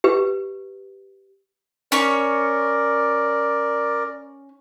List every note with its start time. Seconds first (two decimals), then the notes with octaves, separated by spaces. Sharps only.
0.04 G4 B4
1.92 C#4 A#4 C#5 D5 C#6